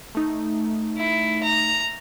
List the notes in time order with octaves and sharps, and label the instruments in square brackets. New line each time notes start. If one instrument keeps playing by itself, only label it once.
[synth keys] A3 D#4
[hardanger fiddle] E4
A#5